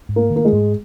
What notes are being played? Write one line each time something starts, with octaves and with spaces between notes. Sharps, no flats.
G#2
A#3
D#3
A#3
G#3
G#2